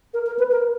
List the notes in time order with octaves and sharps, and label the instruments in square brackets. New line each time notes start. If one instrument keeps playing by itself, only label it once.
[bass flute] A#4
A#4
B4
A#4